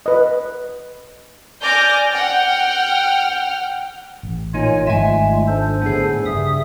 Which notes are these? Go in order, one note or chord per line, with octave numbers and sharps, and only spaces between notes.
B4 D#5
D5 G#5 D6 F6 G6 A#6
F#5 G5 F6
A1
A#2 A#3 D#4 F4 C#5 G#5
G#1 G#2 F3 G#3 A3 F4 E5 G#5
D4 A4 C5
A2 D3 B3 G#4
G2 C#3 E5 D#6